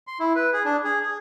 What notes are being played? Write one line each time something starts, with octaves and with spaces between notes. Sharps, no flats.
C6
E4
B4
G#4
D4
G#4
G#4